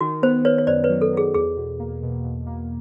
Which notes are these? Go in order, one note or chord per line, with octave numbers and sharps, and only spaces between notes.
D#3 F#4
B3 C5
B3 B4 C#5
C#5
F#2 C5 D5
B4 C#5
F#3
A4
F#3 G#4
E2 G#4
B2
A#3
B2
B2
A#3